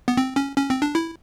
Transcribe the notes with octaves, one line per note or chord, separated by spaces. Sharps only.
B3
C4
C#4
C#4
C4
D4
E4